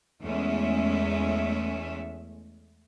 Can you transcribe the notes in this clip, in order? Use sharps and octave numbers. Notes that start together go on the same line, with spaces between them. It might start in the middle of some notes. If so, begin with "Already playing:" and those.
E2 G#3 A3 C#4 E5